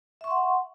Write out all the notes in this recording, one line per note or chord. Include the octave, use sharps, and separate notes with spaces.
E5 F#5 C6 C#6